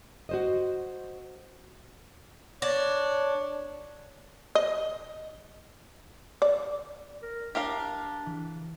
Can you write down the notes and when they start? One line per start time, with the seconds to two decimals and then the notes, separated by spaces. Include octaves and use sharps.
0.29 F#4 C5 D#5
2.62 D4 C#5
4.55 D#5
6.42 D5
7.22 A#4
7.55 D4 G4 A#4 F5
8.26 E3